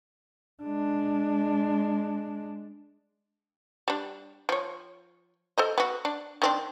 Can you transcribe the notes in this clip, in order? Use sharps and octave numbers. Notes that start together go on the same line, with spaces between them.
G#3 D4
G3 D4
F3 C#5
A4 C5 D#5
B3 F#4
D4
D#3 C4 D4